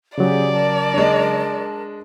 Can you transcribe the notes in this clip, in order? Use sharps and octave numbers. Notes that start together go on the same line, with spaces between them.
C#3 F#3 G4 G#4 D5
A#4 A5
G#3 D4